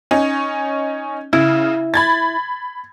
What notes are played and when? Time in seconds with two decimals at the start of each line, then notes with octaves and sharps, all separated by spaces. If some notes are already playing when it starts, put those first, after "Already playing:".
0.11 C#4 D#4
1.33 C#3 E4
1.94 B5 G#6 A6